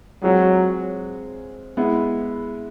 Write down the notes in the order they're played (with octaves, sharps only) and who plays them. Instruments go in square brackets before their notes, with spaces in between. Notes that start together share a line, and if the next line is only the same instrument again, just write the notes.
[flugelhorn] F#3 [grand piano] G#3 C4 F4 G#4
[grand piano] G#3 B3 E4